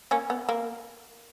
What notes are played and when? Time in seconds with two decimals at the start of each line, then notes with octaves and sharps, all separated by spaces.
0.11 A#3 C#4
0.30 B3
0.49 A#3